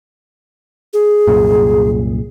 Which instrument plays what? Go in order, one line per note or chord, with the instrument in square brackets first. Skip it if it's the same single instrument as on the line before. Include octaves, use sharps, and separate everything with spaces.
[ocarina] G#4
[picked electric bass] C2 F#2 A#2